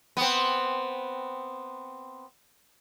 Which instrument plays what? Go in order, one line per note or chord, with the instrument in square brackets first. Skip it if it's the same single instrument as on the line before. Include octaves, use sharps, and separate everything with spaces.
[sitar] B3 C4